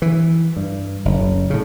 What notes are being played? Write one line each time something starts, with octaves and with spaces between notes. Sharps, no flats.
E3
G2
F#1
A2 C#3